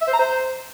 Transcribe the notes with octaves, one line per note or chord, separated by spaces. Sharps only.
E5
C5
A#5
C5